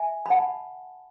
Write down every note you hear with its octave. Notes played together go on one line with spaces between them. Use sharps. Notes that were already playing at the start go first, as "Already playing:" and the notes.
Already playing: E5 G#5
B5
F#5 A5